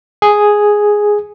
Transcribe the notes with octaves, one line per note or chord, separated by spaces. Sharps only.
G#4